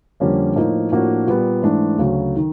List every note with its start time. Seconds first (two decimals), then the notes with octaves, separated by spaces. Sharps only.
0.20 F2 D3 G3 A#3 C#4
0.56 A2 F3 A#3 D#4
0.92 A2 F3 A#3 D4 F#4
1.27 A#2 G3 B3
1.63 G#2 E3 A3 D4
1.98 D2 C#3 F#3
2.36 D#3